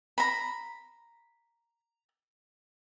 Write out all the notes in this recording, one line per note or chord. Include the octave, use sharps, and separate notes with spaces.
A#5 B5